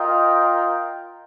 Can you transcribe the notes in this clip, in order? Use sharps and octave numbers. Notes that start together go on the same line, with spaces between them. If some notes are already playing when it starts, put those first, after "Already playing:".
Already playing: F4 A#4 D#5 G5